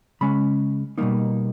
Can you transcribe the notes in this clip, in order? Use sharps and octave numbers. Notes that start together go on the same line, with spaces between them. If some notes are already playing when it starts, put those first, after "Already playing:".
C#3 G#3 C#4 B5
B2 G3 A#3 D#4